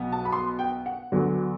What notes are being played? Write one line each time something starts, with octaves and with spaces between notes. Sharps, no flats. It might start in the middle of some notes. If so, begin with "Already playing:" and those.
Already playing: B1 B2 B3
A5
B5
C6
G5
F#5
D2 D3 F#3 B3